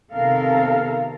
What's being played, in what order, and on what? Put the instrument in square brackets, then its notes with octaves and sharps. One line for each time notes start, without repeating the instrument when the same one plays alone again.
[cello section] C3 D#3 B3 A4 A#4 F5